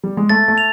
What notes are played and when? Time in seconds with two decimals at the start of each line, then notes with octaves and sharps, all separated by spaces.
0.04 G3
0.17 G#3
0.29 A3 A6
0.48 A3
0.58 F7